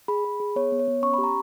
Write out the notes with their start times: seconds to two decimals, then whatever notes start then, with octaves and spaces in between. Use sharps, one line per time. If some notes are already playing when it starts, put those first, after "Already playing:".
0.08 G#4 B5
0.24 G#4
0.40 G#4
0.56 B3 C#5
0.72 B3
0.79 C#5
0.88 B3
1.03 C#4 C#6
1.14 G4 B5
1.23 A#5